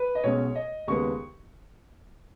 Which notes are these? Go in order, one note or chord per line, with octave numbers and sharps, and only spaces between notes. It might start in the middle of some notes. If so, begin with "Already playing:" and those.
Already playing: B4
D#5
B1 B2 G#3 C#4 C#5
D#5
D#2 C#3 G#3 B3 C#6